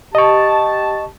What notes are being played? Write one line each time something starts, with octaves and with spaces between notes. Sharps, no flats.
G4 D#5 A5 C#6